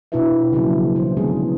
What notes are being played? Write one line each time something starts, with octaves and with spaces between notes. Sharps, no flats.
B2 D4 E4 F4 B4 E5
C#3 F3 F#3 A#3
E3 C5
D3 G#3 B3 D4 G#4